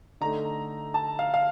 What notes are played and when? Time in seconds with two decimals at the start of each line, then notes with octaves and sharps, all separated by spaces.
0.21 D3 A3 D#4 A#5
0.94 A5
1.19 F5
1.34 F5